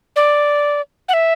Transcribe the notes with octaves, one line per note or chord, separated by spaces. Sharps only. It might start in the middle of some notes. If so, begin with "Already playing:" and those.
D5
F#5
E5